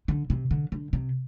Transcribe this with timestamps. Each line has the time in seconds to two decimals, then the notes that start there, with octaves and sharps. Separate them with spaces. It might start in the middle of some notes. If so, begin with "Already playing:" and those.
0.08 D3
0.30 C3
0.51 D3
0.72 D3
0.93 C3